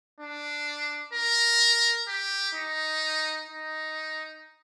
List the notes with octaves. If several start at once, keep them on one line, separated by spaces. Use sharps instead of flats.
D4
A#4
G4
D#4
D#4